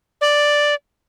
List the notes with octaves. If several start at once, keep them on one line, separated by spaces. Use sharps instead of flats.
D5